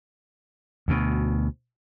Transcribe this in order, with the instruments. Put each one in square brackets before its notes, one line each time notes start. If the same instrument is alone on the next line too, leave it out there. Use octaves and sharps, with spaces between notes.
[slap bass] D2 B2